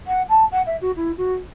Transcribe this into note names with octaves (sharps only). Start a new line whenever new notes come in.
F#5
A5
F#5
E5
F#4
E4
F#4